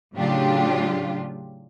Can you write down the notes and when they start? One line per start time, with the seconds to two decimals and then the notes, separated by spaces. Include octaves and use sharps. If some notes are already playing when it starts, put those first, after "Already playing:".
0.15 A2 C#3 F#3 D4 F4 G4